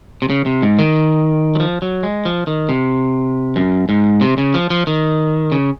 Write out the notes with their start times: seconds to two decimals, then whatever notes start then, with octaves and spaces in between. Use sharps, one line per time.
0.22 C3
0.30 C#3
0.46 C3
0.62 G#2
0.79 D#3
1.55 F#3
1.60 F3
1.82 F#3
2.03 G#3
2.25 F3
2.47 D#3
2.69 C3
3.56 F#2
3.89 G#2
4.21 C3
4.38 C#3
4.54 F3
4.70 F3
4.87 D#3
5.52 C#3